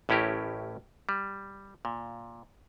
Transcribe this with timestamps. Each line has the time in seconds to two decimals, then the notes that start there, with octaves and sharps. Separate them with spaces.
0.09 A1 A2 C#4 E4 G4 A#4
1.09 G3
1.85 A#2